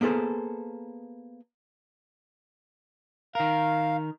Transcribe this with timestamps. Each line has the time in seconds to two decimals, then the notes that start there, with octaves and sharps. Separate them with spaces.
0.01 A#3 B3 G#4 A4 C5
3.35 D#3 A#4 F5